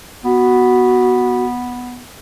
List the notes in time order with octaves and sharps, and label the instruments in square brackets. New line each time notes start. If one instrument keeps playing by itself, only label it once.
[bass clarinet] B3 [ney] F#4